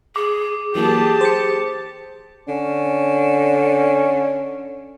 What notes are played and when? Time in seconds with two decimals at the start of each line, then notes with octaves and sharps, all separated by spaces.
0.16 G#4 D6
0.75 E3 F#3 A#3 G4 G#4 A5
1.21 C5 A6 C#7
2.48 D3 C#4